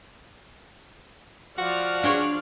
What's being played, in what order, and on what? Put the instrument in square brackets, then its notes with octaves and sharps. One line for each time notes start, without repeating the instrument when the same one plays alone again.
[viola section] F3 D5 F5 [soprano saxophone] F#4
[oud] D4 G#4 C#5